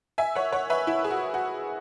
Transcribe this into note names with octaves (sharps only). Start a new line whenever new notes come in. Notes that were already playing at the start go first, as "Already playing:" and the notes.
E5 G#5
C#5 F#5
C#5 F#5
B4 E5
E4
G#4
F#4
F#4